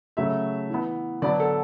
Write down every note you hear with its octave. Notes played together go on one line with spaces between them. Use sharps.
C#3 F#3 A3 C#4 E5
E3 B3
D3 F#3 B3 D5
A4